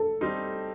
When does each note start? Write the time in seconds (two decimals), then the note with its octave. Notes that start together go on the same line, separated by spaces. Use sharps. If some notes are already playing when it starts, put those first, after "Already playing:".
Already playing: A4
0.21 G3 C4 D#4